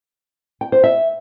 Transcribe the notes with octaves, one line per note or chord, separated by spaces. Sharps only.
G5
C5
E5